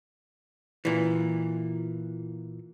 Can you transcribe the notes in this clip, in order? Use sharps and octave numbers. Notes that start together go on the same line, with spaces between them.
A#2 E3